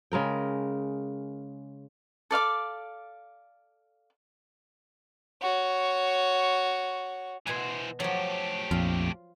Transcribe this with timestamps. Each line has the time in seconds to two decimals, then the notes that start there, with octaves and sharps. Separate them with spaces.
0.12 C#3 G#3 A#4 G5
2.31 A4 D5 F5 D6
5.42 F#4 C#5
7.47 B2 E3 C5 G#5 A#5
8.00 F3 F#3 A3 G4
8.71 A#1 F2 F4